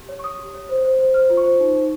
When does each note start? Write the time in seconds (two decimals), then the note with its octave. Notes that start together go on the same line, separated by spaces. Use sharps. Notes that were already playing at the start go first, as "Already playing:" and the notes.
Already playing: G4
0.09 C#5
0.19 C#6
0.24 C#5 D#6
0.39 G4
0.54 C#5
0.69 C5
0.84 C5
0.99 C5
1.14 C5 F6
1.30 F4
1.37 C#6
1.44 C5
1.60 D#4
1.75 D#4